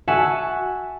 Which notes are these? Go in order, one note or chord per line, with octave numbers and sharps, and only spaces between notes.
F#4 E5 F#5 G#5 A5